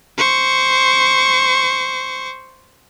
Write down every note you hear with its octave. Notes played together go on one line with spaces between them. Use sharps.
C5 C#6